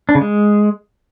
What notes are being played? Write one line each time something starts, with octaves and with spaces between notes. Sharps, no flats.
D4
C#3
G#3